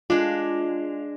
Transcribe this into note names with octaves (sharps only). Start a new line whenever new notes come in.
G#3 D4 F4